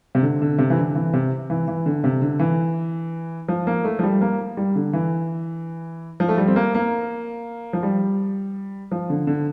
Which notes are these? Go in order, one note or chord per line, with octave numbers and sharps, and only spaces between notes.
C3
D3
D3
C3
E3
D3
E3
C3
E3
E3
D3
C3
D3
E3
F3
A#3
A3
F3
G3
A#3
G3
D3
E3
F3
A3
G3
C4
A#3
A#3
F3
G3
F3
D3
D3